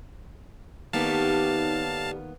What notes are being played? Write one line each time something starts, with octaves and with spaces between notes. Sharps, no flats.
A2 D#3 G3 A#3 B3 D#4 F5 A5